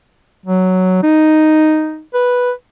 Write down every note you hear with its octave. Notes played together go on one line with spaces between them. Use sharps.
F#3
D#4
B4